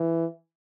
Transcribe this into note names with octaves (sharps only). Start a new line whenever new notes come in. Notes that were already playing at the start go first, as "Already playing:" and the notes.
Already playing: E3